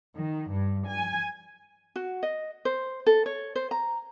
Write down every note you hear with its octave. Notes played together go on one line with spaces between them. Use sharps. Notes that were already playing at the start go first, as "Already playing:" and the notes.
D#3
G2
G#5
F#4
D#5
C5
A4
C#5
C5
A#5